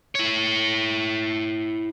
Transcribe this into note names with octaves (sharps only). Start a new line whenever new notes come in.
E4 C#5